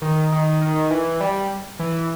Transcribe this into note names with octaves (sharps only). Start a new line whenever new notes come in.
D#3
D#3
D#3
E3
G3
E3